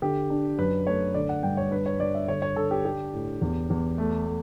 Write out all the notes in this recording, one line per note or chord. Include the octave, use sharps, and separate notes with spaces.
D3 G4
D4
F#2 B4
A3 C#5
D3 D5
F#5
G2 G5
C#5
D4 B4
C#5
G2 D5
E5
D3 C#5
C#5
D3 A4
G4
D4 G4
A2
E2
E2
A3
A3